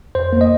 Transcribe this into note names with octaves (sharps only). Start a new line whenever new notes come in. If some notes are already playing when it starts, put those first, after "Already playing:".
F2 C5
A#3
D#5